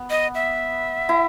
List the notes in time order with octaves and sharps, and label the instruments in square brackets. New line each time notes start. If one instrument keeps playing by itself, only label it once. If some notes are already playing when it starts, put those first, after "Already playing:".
Already playing: [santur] B3
[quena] D#5
E5
[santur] E4